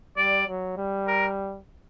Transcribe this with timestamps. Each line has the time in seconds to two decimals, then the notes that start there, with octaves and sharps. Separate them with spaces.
0.17 G3 D5
0.47 F#3
0.77 G3
1.07 A#4